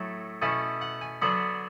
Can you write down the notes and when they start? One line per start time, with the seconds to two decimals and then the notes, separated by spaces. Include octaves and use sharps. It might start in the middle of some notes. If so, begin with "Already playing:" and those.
Already playing: A2 F#3 A3
0.42 B2 A3 C#4 E4 G#5
0.81 F#5
1.01 G#5
1.22 D3 F#3 B3 D4 B5